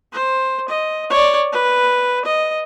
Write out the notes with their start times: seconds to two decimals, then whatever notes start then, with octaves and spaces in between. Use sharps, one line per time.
0.13 C5
0.69 D#5
1.10 C#5 D5
1.53 B4
2.25 D#5